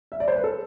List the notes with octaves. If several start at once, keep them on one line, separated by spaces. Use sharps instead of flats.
E5
D5
C5
B4
A4